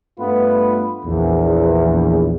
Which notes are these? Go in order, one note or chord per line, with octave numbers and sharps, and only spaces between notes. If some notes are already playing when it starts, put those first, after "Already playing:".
G2 A3 B3 F4 B4
A#1 E2